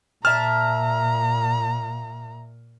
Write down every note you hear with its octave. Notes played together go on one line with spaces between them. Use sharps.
A#2 D5 E5 A5 A#5 F6